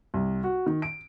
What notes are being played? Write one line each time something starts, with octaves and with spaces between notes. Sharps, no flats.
C2
F#4
D#3
D7